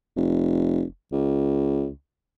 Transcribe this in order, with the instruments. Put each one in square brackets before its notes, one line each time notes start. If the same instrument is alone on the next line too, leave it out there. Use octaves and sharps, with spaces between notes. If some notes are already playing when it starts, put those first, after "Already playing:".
[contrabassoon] F1
C#2